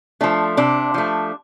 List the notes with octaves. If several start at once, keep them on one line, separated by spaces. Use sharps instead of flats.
F3 A3 D4
C3 D4
F3 A3